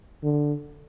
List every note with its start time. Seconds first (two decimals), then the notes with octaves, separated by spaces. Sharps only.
0.24 D3